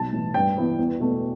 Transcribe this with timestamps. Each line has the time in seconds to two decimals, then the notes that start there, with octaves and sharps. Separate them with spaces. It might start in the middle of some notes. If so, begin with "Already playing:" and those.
Already playing: B1 A5
0.13 A2 E3
0.34 G2 G5
0.57 E3 B3 E4
0.79 E2
1.00 B2 A3